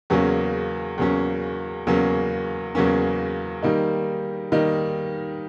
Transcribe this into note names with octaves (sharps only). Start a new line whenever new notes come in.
E2 C#3 F#3 A#3 C#4
E2 C#3 F#3 A#3 C#4
E2 C#3 F#3 A#3 C#4
E2 C#3 F#3 A#3 C#4
D#3 G3 A#3 D#4
D#3 G3 A#3 D#4